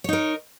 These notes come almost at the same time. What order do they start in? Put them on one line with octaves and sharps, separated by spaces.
C#5 D#4 A#4